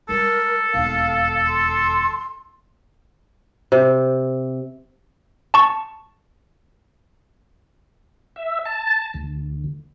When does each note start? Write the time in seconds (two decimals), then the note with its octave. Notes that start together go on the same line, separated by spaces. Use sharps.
0.09 G3 G#3 A4 A#4
0.74 E1 D#2 F5
1.47 C6
3.72 C3
5.54 A5 C#6
8.36 E5
8.65 A5
9.14 D2